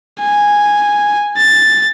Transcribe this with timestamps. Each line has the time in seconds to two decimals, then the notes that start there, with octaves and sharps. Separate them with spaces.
0.20 G#5
1.37 A6